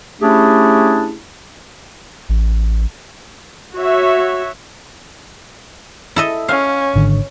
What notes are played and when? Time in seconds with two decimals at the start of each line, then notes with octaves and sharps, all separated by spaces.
0.22 A3 C#4 D4 E4 G4 G#4
2.29 A1
3.75 F#4 C#5 E5
6.16 E4 A4 D#5
6.48 C#4 F5
6.96 G#1 D3